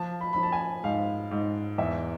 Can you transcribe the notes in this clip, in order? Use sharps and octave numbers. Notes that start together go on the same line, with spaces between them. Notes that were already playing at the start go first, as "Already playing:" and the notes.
Already playing: F3 A5
B5
F3 B5
A5
G#5
G#2 F5
G#2
E2 E5